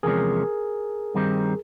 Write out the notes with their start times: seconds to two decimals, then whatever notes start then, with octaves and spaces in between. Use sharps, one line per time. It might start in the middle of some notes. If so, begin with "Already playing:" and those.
0.03 E2 C3 F3 G#3 C#4 G#4 A#4
1.15 G2 D#3 G3 C4 D#4